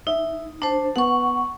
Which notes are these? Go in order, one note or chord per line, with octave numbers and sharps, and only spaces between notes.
D#4 E5
D4 C5 A5
B3 F#5 C#6